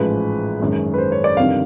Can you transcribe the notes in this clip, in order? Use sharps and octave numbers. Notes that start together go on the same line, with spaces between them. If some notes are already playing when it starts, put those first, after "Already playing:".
Already playing: A1 G#2 F3 G#3 B4
G#1 F#2 D#3 G#3
B4
C5
C#5
D5
G1 F2 C3 D#3 G3 F5